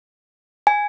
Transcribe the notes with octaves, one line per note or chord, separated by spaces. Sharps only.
G#5